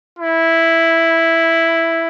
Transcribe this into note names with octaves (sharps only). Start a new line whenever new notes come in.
E4